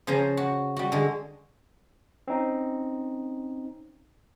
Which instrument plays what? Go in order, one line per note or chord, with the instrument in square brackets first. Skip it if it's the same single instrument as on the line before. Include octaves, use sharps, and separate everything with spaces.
[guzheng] C#3 F3 C5 G#5 A#5
F#4
G3 F#4
D3 G#3
[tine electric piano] C4 C#4 D#4